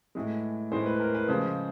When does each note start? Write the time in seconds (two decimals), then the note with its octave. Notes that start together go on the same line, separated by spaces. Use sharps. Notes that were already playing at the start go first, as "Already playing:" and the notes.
0.15 A2 E3 G#3
0.71 A2 E3 G#3 C5
0.86 B4
1.00 A#4
1.15 B4
1.28 C#3 F3 G#3 C5